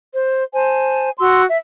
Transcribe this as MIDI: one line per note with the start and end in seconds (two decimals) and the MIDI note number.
0.13 0.43 72
0.54 1.10 72
0.54 1.10 80
0.54 1.10 81
1.19 1.43 66
1.19 1.43 84
1.19 1.43 88
1.49 1.57 76